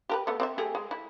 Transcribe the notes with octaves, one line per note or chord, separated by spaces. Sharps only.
G4 A#4 B4
A3 B3
C4 D5 E5
A3 G4 G#4
G#3
E4